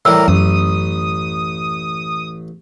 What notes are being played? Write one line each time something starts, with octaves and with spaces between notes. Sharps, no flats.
A2 E3 G3 A#4 E6
A1 F#2 D#6